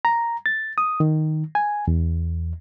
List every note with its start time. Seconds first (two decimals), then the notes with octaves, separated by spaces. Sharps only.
0.05 A#5
0.46 A6
0.78 D#6
1.00 D#3
1.55 G#5
1.88 E2